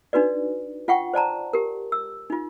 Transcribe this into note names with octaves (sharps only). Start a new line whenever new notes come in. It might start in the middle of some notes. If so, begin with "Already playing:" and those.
D4 D#4 F#4 B4 D5
F4 F#5 G5 C#6
C5 D5 A5 A#5
G4 A#4
E6
D#4 F4